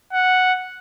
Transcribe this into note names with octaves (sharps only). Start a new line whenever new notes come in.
F#5